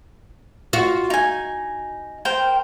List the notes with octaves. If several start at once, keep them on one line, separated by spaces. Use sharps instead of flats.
F4 F#4
D#4 G#5
A#4 C5 G5